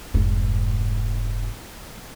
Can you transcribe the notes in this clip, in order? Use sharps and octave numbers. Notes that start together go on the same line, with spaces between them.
F1 G#2